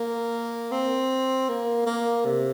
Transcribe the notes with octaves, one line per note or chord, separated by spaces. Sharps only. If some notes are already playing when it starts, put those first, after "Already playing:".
Already playing: A#3
C4
A#3
A#3
C3